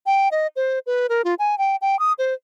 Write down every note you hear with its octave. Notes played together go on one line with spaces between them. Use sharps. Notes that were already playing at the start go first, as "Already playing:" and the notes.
G5
D#5
C5
B4
A#4
F4
G#5
G5
G5
D#6
C5